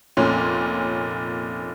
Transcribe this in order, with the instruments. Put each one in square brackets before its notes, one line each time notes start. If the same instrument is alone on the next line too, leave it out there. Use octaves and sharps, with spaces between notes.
[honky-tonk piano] F1 A#2 C#4 C6